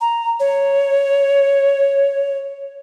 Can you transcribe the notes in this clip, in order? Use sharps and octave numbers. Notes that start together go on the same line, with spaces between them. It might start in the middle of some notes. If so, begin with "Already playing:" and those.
A#5
C#5